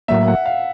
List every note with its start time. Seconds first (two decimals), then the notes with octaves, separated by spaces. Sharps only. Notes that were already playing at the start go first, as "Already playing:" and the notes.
0.08 A2 F#3 A#3 E5
0.27 F#5
0.45 F5